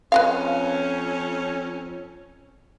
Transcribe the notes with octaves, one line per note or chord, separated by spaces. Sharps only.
F2 C#4 B4 D#5 F5